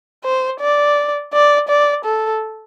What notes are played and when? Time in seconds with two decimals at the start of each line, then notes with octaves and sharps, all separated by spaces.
0.24 C5
0.60 D5
1.33 D5
1.68 D5
2.05 A4